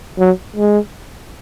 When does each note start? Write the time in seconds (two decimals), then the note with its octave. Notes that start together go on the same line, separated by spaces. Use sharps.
0.19 F#3
0.56 G#3